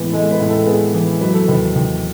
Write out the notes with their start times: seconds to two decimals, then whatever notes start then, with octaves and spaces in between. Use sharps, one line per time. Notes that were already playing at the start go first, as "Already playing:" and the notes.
Already playing: A2 E3 G#3 B3
0.12 G#3 A4
0.31 B4
0.40 A2
0.49 A4
0.66 B3 G#4
0.94 E3
1.21 F#3 B4
1.34 A4
1.48 D#2 B4
1.76 D#2